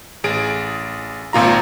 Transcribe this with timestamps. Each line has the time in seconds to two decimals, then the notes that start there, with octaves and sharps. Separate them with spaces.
0.24 A1 G#4 D7
1.33 G#1 A#2 F4 A#5